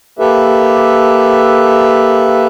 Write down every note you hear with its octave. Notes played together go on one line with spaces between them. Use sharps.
A#3 G4 A4 B4 E5